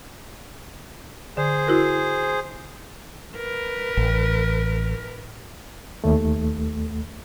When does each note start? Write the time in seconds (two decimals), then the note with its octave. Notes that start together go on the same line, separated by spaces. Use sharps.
1.37 D3 G#4 C5
1.67 E4 F#4 A#4
3.36 A#4 B4
3.97 A1
6.04 D#2 A3